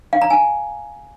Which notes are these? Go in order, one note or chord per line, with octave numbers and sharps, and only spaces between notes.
F5
A#5
G#5